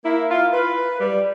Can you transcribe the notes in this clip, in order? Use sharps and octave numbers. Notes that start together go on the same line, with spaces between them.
A#3 E4
F4
B4
G3